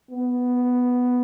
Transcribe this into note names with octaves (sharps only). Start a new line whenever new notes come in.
B3